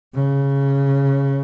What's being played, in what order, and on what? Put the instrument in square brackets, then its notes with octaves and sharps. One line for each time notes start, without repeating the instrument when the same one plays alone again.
[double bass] C#3